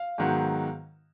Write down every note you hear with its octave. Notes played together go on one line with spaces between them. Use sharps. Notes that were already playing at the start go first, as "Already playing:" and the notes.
Already playing: F5
G#2 D#3 F#3 B3